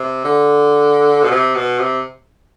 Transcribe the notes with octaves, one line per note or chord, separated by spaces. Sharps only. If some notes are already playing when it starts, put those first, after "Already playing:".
Already playing: C3
D3
B2
C3
B2
C3